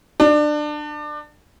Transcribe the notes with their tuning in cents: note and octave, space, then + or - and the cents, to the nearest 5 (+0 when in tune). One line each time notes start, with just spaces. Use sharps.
D4 +25